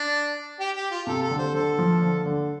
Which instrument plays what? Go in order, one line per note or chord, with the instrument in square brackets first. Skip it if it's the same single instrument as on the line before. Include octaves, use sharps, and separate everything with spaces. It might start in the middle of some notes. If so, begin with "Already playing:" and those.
Already playing: [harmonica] D4
G4
G4
F4
[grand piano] C3 [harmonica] A4
[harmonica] A4
[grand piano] D3
[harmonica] C5
[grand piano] D3 [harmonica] A4
[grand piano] F3
D3
D3